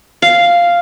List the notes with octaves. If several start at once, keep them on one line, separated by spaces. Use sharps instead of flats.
F5